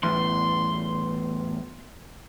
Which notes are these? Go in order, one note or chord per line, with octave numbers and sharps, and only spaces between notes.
E2 A2 C6